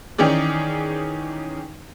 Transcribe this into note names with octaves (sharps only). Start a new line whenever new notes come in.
D#3 E3 C#4 D#4 G#4 D5